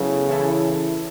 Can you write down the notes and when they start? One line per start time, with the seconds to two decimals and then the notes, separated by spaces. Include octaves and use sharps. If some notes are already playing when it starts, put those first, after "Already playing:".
Already playing: C#3 F#3 B3 E4 A4
0.29 E3 C#4 E4 A4